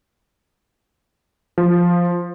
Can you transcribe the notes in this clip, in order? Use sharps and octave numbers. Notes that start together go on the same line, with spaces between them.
F3